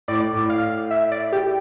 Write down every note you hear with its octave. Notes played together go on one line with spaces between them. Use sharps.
A2 D5
A2
F5
E5
D5
G4